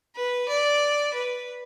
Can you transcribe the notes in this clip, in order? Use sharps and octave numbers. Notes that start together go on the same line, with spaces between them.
B4
D5
B4